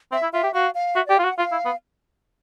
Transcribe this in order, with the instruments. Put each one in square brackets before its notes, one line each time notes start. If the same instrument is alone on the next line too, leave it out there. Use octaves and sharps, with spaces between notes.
[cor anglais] C4 [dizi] E5
[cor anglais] E4
[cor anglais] F4 [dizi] E5
[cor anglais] G4
[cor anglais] F#4 [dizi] F5
[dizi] F5
[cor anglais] F#4 [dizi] E5
[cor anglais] G4 [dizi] D5
[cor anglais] F4 [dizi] F5
[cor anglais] F#4
[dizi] F#5
[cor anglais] F4 [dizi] F5
[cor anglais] E4
B3